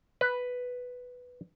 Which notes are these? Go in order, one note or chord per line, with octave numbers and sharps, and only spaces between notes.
B4